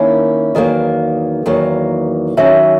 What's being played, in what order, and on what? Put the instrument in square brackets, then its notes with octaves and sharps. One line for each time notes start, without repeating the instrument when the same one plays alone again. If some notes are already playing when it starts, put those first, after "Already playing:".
Already playing: [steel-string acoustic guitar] D#3 A#3 C#4 E4
[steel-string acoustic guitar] E2 D#3 F#3 A#3 [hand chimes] D#5
[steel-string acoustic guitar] E2 D#3 F#3 A#3
[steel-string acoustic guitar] F#2 D#3 F#3 C#4 [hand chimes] E5